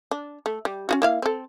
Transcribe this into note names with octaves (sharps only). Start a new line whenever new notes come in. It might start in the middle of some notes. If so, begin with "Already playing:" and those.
D4
A3
G3
C#4 F4 F#4
A#3 E4 F5
C4 A4